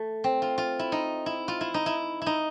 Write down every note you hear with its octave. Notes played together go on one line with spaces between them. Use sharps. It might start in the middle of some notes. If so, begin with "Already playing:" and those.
Already playing: A3
C4
F4
F4
E4
D#4
E4
F4
E4
D#4
E4
D#4 E4